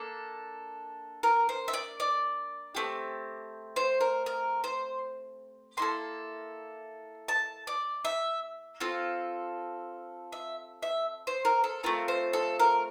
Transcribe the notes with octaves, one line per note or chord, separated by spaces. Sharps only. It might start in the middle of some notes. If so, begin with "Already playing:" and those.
Already playing: A#3 D4 A4
A#4
C5
E5
D5
D5
A3 C4 G4
C5
A#4
A#4
C5
A#3 E4 A4 C6
A5
D5
E5
C4 F4 A4
E5
E5
C5
A#4
A4
A3 C4 F4 A#4
C5
A4
A#4